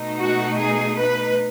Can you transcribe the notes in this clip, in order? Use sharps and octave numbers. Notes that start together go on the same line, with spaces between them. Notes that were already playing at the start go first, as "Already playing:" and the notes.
Already playing: B2 A3 D#4
F#4
G#4
B4